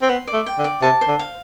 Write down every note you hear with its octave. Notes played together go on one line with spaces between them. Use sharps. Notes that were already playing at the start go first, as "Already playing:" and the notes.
C4
B3 C6
D5
A3
G5
D3
D5
C3 A5
C5
D3
F5